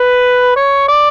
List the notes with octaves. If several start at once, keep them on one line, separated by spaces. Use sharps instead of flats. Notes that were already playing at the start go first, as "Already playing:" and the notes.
Already playing: B4
C#5
D5